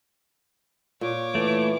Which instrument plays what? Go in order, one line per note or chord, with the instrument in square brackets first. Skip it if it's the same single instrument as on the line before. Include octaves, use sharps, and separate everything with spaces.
[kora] A#2 [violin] C#5 D6
[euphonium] E3 [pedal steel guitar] A3